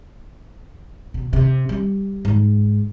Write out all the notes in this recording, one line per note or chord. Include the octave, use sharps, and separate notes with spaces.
B2
C3
G3
G#2